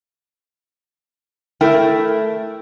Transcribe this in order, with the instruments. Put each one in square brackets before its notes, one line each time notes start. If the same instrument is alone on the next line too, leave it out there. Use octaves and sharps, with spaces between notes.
[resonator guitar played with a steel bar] A3 E4 A#4 G5